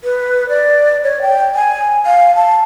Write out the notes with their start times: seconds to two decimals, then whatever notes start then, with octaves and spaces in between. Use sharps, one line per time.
0.04 B4
0.49 D5
1.04 C#5
1.22 G5
1.55 G#5
2.06 F5
2.36 A5